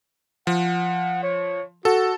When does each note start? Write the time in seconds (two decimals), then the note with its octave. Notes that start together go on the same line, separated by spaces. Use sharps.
0.47 F3 F#5
1.23 C#5
1.85 F#4 A4